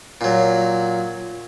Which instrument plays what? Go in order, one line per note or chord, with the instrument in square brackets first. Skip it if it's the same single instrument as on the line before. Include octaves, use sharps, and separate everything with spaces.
[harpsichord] A#2 F#3